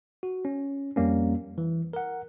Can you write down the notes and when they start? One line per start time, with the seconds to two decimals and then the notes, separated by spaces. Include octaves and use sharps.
0.23 F#4
0.45 C#4
0.96 F2 G3 A#3 C#4
1.58 E3
1.93 A#4 F#5